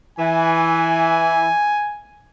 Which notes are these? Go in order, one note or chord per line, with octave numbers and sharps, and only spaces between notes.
E3 G#5